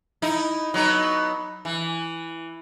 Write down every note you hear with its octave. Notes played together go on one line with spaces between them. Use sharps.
D#4 E4
F#3 B3 D#4
E3